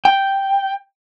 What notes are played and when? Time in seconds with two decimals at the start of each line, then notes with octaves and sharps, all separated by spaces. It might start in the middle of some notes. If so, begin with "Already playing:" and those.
0.05 G5